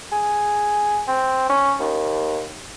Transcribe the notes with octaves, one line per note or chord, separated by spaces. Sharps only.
G#4
C4
C#4
D#2